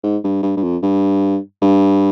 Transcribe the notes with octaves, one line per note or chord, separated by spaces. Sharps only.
G#2
G2
G2
G2
F2
G2
G2